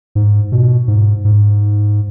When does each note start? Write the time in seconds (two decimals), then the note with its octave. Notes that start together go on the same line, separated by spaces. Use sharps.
0.15 G#2
0.52 B2
0.88 G#2
1.25 G#2